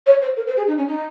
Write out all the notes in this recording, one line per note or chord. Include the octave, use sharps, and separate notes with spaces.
C#5
C5
A#4
C5
G#4
D#4
C#4
D#4